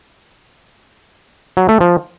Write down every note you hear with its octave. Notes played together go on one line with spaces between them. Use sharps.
F#3
A3
F3